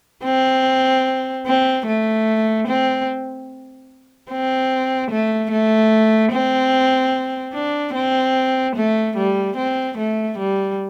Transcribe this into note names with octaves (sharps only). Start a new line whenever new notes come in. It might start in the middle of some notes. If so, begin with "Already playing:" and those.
C4
C4
A3
C4
C4
A3
A3
C4
D4
C4
A3
G3
C4
A3
G3